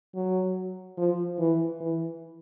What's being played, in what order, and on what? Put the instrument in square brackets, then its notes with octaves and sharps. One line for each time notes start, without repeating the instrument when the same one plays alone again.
[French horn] F#3
F3
E3
E3